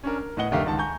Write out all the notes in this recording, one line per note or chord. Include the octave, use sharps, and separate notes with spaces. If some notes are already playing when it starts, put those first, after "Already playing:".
C#4 D4 A#4
A#4
A2 B3 D#5 F#5 G7
F1 D3 A3 G4 A#4 F5
C#2 D#3 F#5 A5
G#5 A#5 C#6 G6